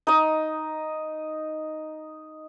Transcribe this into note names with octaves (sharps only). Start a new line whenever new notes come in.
D#4 D#5